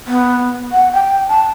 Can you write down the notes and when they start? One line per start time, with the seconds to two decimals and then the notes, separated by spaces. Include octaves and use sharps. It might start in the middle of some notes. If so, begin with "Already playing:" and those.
0.08 B3
0.72 F#5
0.94 G5
1.28 A5